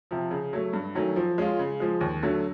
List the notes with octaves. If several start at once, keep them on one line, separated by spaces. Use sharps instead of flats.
C3 F3
C#3
F#3 A3
G2
D#3 F#3 A3 C#4
F3
G#3 C#4 F4
C#3
F3 G#3
D#2
D3 F#3 A3